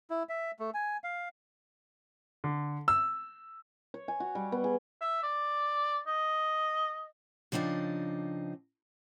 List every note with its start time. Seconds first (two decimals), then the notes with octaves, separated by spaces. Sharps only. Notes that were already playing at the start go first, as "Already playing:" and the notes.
0.10 E4
0.29 E5
0.59 A3
0.74 G#5
1.04 F5
2.44 D3
2.88 E6
3.94 C#5
4.08 G#5
4.20 F#4
4.35 G3
4.52 B3
4.64 G#4
5.01 E5
5.23 D5
6.07 D#5
7.52 C#3 F3 C4 D4 D#4